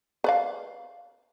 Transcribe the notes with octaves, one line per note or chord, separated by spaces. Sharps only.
B4 D5 F5